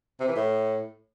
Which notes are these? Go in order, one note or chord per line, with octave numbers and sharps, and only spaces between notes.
C3
E3
A2